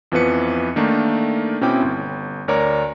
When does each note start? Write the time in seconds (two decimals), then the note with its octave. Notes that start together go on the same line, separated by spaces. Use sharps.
0.12 F2 E3 F3 B3 B4 C#7
0.76 D#3 A3 A#3 D4 D#4
1.61 B2 C4 C#4 E4 G5 D6
1.82 G1
2.48 D2 A#4 C#5 D5 A#5